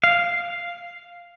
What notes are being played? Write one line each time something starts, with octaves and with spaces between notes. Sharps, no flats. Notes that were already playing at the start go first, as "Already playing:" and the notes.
F5